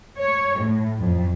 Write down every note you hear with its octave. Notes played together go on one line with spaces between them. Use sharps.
C#5
A2
F2